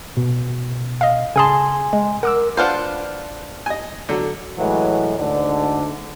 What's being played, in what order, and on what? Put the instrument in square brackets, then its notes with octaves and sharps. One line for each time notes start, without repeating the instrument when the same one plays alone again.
[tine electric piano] B2
[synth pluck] D#5 F5
[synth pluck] C#3 G#4 A5 [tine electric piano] G#5 C6
[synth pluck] G#3
[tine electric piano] A#4 [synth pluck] F#5 D6 E6
[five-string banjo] D4 F4 C5 [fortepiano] B4 F5 F#5
[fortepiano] D#5 G#5
D3 F#3
[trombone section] A2 E3 F#3 G#3
D2 G#2 D3 D4